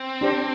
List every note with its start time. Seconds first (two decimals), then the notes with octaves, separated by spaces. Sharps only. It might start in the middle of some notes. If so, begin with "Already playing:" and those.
Already playing: C4
0.21 D4 G4 C5